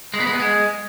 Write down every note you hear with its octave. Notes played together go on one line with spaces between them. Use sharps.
G#3
B3
G#3
B3
G#3